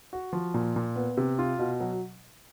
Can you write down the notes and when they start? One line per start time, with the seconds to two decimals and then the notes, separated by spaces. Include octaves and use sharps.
0.13 F#4
0.33 F3
0.54 A#2
0.76 A#2
0.96 B3
1.17 C3
1.39 F4
1.59 B2
1.80 F#3